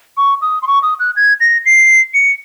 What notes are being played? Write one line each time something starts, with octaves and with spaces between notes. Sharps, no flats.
C#6
D#6
C6
C#6
D#6
F#6
G#6
A#6
C7
C#7